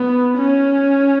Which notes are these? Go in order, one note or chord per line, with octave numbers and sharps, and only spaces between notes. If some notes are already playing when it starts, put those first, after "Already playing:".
Already playing: B3
C#4